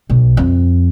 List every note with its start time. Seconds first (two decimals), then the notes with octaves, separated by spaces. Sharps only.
0.10 B1
0.37 F2